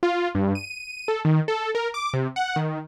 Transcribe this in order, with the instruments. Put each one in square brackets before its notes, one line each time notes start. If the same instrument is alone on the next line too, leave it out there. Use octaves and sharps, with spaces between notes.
[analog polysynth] F4
G2
D#7
A4
D#3
A4
A#4
D6
C3
F#5
D#3